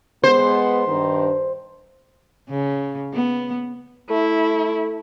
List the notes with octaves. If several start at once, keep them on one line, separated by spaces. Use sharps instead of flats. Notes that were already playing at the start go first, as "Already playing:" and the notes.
G#3 B3 C5
G2 D#3
C#3
B3
A3 E4